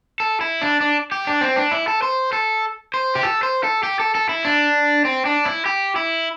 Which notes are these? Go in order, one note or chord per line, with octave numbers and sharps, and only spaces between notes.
A4
E4
D4
D4
G4
D4
C4
D4
E4
A4
C5
A4
C5
G4
A4
C5
A4
G4
A4
A4
E4
D4
C4
D4
E4
G4
E4